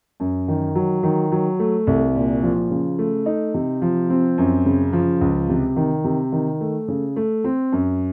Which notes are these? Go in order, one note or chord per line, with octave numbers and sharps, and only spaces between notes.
F#2
D#3
F#3
D#3
F#3
A3
C2
A#2
F3
C#3
A3
D#4
C3
F3
C4
F#2
C#3
F3
C#2
C3
D#3
C3
D#3
A3
C#3
A3
C4
F#2